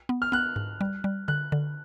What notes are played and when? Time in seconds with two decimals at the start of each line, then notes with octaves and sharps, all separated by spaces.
0.09 B3
0.22 F6
0.32 B3 F#6
0.56 G#2
0.81 G3
1.04 G3
1.28 D3 F#6
1.52 D3